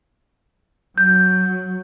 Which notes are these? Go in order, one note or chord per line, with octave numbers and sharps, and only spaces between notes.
F#3 G6